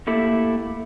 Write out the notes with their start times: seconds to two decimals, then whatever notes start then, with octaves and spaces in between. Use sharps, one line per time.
0.07 A3 A#3 E4 G4 A4